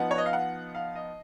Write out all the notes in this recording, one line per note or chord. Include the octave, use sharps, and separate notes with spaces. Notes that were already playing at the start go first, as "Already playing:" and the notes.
Already playing: F3 B3 D#4 F#5
C#5
D#5
F5
F#5
F5
D#5